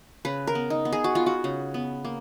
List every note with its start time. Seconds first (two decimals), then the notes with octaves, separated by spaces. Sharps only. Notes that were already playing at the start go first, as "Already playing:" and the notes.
0.25 C#3 B4
0.47 A#4
0.55 B3
0.70 D#4
0.85 B3
0.92 G#4
1.04 F#4
1.15 B3 F4
1.26 F#4
1.44 C#3
1.74 B3
2.05 A#3